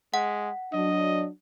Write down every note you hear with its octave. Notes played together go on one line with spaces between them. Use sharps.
G#3 F#5
F#3 D4 D#5